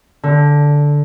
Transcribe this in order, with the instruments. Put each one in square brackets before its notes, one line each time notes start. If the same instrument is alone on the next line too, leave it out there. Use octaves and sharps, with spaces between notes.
[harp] D3